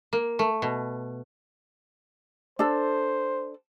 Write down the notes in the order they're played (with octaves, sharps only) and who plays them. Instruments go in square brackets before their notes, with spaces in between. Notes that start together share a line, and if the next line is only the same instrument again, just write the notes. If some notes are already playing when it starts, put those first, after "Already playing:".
[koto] A#3
A3
B2
[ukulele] D4 A4 [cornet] C5